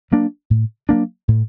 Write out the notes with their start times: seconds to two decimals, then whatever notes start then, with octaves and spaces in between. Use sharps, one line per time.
0.11 F#3 A#3 D4
0.50 A2
0.89 F#3 A#3 D4
1.28 A2